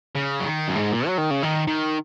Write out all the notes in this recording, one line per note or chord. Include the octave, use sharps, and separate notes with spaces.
C#3
F#3
D#3
F#2
G#2
A#2
F#3
D#3
C#3
D#3
D#3